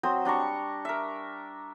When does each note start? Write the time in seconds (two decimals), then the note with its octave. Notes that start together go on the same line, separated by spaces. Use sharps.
0.03 F#3 C4 C5 D#6
0.25 G3 D4 A#5 C#6
0.85 A#4 E5